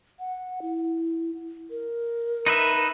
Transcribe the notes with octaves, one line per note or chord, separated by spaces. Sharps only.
F#5
E4
A#4
D#4 B4 E5